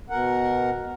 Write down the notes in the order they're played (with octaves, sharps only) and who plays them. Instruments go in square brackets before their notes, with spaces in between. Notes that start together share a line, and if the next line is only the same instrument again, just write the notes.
[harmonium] B2 A#4 F#5